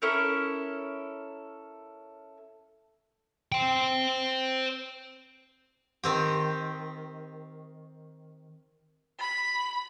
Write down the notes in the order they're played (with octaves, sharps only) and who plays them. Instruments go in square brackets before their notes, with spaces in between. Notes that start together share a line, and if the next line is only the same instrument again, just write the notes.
[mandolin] C#4 E4 A4 A#4
[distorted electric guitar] C5 G5
[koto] D#3 C4 G4
[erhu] B5